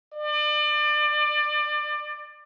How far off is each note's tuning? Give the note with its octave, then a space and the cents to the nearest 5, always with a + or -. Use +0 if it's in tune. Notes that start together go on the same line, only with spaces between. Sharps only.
D5 +30